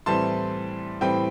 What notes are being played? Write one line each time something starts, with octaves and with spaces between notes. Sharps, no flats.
A2 E3 G3 C4 A5 C6
A2 E3 G3 C4 G5 B5